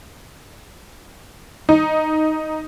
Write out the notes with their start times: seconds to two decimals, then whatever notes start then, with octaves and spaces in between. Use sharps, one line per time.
1.69 D#4